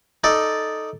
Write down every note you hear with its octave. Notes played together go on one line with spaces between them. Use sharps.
D#4 A4 D5 D#5